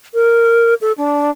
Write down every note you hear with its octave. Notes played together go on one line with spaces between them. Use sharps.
A#4
A4
D4